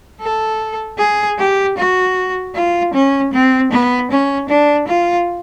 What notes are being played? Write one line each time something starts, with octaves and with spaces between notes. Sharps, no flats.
A4
G#4
G4
F#4
F4
C#4
C4
B3
C#4
D4
F4